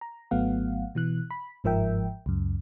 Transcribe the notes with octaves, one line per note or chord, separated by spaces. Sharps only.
A#5
G#1 F#3 A3 B3 F5 F#5
B2 E3 F#6
B5
G1 G#2 F3 A#4 E5 G5
C#2 F#2